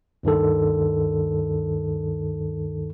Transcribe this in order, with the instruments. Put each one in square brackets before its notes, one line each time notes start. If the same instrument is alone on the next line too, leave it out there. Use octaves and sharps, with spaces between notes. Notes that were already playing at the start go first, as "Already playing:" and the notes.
[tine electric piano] D2 G2 D#3 A4